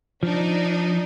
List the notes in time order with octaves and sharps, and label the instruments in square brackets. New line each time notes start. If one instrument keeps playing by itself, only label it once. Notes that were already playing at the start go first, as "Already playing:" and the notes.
[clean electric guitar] F3 [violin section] D4 D#4